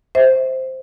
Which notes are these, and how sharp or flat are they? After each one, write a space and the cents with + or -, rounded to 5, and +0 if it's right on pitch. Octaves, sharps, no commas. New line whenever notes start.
C5 +0 E5 -30